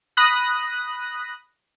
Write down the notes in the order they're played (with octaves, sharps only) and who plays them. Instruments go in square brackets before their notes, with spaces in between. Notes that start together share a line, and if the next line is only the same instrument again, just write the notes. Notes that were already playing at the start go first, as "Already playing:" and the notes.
[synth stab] B5 D#6 F#6 A#6